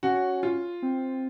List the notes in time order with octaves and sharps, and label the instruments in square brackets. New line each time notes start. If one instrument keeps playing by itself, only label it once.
[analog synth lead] C#4 [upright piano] F#4
[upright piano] F4
[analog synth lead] C4